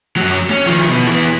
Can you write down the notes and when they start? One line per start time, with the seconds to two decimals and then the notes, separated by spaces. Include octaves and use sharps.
0.17 F#2 F#3
0.50 C#4
0.66 D#3 F3
0.90 B2
1.07 E3 B3